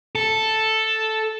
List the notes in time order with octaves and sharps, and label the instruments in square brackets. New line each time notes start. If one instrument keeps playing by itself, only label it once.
[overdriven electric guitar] A4